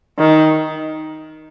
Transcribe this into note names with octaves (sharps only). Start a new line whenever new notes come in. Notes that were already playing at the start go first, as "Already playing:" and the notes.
D#3